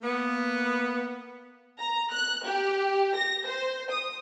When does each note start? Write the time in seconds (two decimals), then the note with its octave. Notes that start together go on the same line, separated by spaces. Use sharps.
0.02 A#3 B3
1.79 A#5
2.13 F#6
2.46 G4
3.16 A#6
3.46 C5
3.91 D#6